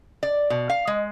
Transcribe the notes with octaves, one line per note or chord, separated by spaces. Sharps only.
D5
B2
F5
G#3